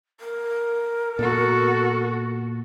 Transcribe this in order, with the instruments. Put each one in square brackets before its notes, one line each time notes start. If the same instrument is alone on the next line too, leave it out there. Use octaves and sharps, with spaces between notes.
[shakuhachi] A#4
[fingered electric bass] A#2 B3 [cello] F#4 A4